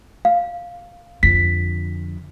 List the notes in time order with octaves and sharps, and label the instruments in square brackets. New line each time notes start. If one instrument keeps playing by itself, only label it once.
[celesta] F5
[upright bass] F2 D3 [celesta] B6